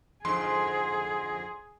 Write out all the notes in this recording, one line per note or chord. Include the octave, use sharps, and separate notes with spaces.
F2 G#2 D3 G#4 C6